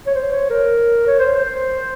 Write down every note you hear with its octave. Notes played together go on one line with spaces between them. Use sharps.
C#5
C5
C#5
A#4
C#5
C5
C5